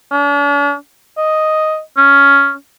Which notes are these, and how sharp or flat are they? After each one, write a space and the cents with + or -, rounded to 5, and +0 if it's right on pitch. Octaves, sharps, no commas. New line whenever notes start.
D4 -45
D#5 +5
C#4 +10